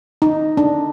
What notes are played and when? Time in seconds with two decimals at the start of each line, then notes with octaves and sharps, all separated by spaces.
0.22 D#4
0.57 D4